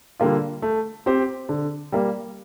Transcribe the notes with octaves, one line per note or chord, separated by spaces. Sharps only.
D3 G3 A#3 F4
A3
C4 G4 C5
D3
G3 A#3